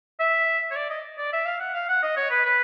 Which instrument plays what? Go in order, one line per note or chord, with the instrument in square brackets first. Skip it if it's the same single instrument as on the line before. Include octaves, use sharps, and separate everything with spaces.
[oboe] E5
C#5
D5
D#5
D5
E5
F5
F#5
F5
F#5
D#5
C#5
B4
B4